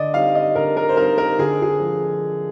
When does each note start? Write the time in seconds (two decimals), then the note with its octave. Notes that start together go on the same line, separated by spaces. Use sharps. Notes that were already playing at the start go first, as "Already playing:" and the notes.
Already playing: D3 D5 D#5
0.13 G3 C4 D#4 F5
0.35 D#5
0.55 D3 A#4
0.77 A#4
0.89 C5
0.97 G3 C4 D#4 A#4
1.18 A#4
1.39 D3 G#4
1.62 G#4
1.80 F3